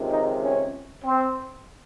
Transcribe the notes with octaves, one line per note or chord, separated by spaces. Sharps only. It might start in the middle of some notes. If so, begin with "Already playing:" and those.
Already playing: C#2 C3 D#3
D#4
C#4
C4